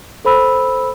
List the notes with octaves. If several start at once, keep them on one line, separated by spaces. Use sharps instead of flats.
A4 C5 B5 E6